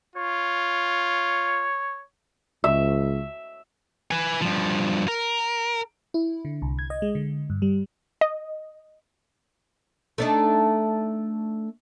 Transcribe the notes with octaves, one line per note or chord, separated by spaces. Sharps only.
F4 C#5
C#2 E5
B4 G#5
G2 F3
A#4
E4
D3
C2
G#6
D#5
G#3
D3
G2
G3
D#5
A3 D4 D#4